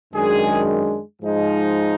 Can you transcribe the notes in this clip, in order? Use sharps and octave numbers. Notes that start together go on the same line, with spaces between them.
F#2 D#3 G#3 D4 G#4
G#2 F3 G#3 D#4